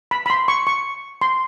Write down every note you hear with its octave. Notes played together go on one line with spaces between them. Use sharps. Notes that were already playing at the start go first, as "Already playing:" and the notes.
B5
B5
C6
C#6
C#6
C6